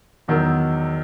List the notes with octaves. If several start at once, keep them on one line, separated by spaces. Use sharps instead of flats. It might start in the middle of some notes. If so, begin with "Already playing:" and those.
E2 D#3 F#3 A#4 E6